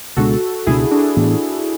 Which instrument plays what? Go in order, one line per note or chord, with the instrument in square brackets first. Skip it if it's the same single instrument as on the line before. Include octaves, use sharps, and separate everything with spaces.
[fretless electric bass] C#2 B2 G#3 D4 [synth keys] F#4 A4
[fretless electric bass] C#2 B2 G#3 D4 [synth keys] E4 G#4
[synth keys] D4 F#4
[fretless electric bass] A2 E3 B3 D4